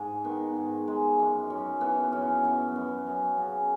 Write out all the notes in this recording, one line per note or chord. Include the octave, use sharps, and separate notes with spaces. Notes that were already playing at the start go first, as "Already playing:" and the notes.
Already playing: G#2 G#4
D#3 B3
G#2
G#3
F#2
F#2 C#4
E3 B3
F#2 C#4
F#2 B3
F#2 B3
F#2 C#4
C#3